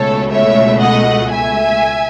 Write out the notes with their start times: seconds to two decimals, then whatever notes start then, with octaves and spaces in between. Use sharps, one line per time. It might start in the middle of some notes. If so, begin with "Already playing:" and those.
Already playing: C#2 B2 A3 A4 C#5
0.31 C#5 E5
0.81 D#5 F#5
1.31 E5 G#5